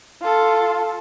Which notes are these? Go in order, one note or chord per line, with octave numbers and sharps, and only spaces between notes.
F4 A4